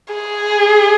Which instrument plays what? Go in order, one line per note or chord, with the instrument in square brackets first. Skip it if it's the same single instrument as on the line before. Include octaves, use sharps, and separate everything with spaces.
[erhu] G#4